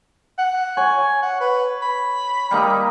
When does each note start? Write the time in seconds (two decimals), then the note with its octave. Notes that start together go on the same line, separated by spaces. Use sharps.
0.38 F#5
0.77 C#5 G#5
1.22 F#5
1.40 B4
1.82 B5
2.51 G3 A#3 D#4